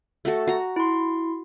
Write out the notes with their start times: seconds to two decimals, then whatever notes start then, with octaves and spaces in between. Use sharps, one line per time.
0.25 A3 F#4 A4
0.48 F#4 A#5
0.76 E4 C6